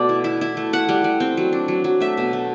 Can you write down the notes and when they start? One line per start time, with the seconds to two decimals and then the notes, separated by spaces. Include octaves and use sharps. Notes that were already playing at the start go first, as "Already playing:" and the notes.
Already playing: B2 A3 D5
0.09 E4
0.24 E4
0.41 E4
0.57 A3
0.73 E4 F#5
0.89 G3
1.04 G3
1.20 C4
1.37 F#3
1.53 D4
1.68 F#3
1.84 F#3
2.00 A3 E5
2.17 B2
2.33 A3